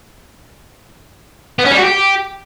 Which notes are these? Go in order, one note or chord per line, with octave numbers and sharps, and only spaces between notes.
B3
C#4
G3
F#4
G4